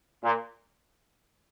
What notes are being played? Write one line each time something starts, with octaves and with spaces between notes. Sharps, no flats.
A#2